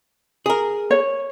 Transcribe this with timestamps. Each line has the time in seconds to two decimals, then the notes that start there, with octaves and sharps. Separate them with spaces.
0.46 G#4 A#4
0.91 C#5